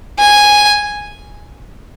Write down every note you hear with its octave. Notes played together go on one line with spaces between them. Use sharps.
G#5